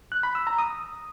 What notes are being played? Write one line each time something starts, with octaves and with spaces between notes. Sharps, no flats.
F#6
B5
E6
A#5
D#6